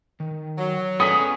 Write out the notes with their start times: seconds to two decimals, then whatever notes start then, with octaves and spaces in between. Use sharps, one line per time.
0.20 D#3
0.58 F#3
1.00 B3 C#4 G#4 A4 F#5 A#5 D#6 B6